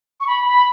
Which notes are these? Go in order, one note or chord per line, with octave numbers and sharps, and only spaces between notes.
C#6
B5
B5